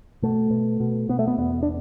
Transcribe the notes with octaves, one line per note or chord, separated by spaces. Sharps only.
B2 A3
B2
B2
B2 B3
A3
B3
E2 B3
D4